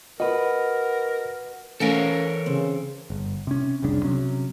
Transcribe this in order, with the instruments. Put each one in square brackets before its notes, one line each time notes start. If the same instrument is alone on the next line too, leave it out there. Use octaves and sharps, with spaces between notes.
[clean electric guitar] F#4 B4 [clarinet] A#4 [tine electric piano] D#5
[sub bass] E3 [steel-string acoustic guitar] A3 C#4 F5 [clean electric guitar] A4 A#4 C#5
[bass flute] C#3 [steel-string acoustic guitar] C4
[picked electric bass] G1
C3 C#4
F1 C2 C#3 D4
C3 F#3 C#4